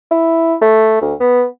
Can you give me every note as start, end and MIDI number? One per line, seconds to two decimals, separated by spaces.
0.11 0.55 64
0.61 0.98 57
1.02 1.14 38
1.20 1.44 59